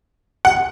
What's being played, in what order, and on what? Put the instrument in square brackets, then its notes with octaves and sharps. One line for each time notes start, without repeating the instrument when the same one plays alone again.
[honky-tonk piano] F#5